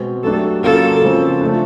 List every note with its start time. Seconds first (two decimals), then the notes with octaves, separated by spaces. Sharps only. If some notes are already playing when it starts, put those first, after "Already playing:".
Already playing: B2 G#3 C4
0.23 F#3 A3 D4 G4 A4
0.63 C#3 F#3 A#3 C#4 F4 A4
1.02 C#3 F3 G#3 C4
1.41 F3 A3 D4